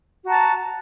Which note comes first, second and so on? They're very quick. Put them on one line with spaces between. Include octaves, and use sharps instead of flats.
F#4 A#5 A5